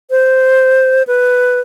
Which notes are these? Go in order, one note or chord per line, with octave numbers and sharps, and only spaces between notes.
C5
B4